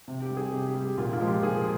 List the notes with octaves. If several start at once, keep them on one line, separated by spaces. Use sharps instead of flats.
C3
G4
G3
G#4
C3 G4
G4
G3
G4
A#2 F4
F4
F3 G#3
G4
A#2 G#4